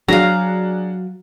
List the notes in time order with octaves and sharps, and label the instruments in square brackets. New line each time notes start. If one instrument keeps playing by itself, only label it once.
[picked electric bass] F#3 [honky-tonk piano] D4 F#4 G#4 [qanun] F5 A#5